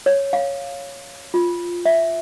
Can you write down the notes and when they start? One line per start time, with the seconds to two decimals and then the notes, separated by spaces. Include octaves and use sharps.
0.06 C#5
0.33 F5
1.34 F4
1.86 E5